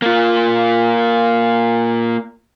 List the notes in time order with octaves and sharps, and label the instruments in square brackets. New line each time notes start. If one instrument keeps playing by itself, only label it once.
[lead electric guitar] A#3 F4